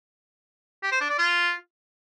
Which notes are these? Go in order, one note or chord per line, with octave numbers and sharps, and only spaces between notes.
G4
C5
D4
D5
F4